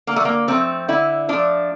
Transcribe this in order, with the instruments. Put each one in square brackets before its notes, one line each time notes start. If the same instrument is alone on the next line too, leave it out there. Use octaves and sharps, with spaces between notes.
[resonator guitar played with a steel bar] D3 A#3
A3
A#3
F3 A3 C4
D3 E4
F3 A3 D4